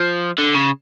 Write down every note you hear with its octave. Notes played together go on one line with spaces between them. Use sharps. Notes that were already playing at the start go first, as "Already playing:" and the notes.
Already playing: F3
D3
C#3